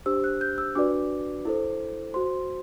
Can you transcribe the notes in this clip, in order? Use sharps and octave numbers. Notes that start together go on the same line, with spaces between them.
D4 G4 C5 E6
F#6
G6
E6
D4 F#4 B4 D5 D6
E4 A4 C5
F#4 C5 C6